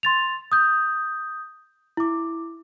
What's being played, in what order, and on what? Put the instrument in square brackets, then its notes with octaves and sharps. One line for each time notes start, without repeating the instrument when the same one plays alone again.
[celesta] C6 A6 F7
D#6 G6
E4 D6